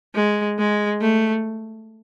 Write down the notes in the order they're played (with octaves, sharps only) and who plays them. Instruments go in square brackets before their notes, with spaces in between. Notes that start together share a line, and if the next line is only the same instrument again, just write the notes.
[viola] G#3
G#3
A3